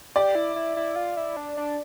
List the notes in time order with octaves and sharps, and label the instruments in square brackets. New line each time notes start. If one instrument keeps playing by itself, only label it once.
[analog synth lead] G4 [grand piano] D5
[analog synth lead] E4
E4
E4
F4
E4
D4
D4